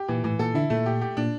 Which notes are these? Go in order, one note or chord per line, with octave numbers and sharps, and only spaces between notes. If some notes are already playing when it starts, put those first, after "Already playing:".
Already playing: G4
A#2 E3
A2 E3
A#2 A4
D3 E4
A#2 A3
G4
G4
A#2 D4